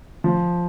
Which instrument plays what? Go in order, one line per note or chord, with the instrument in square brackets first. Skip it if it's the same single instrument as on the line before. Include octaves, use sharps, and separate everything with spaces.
[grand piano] F3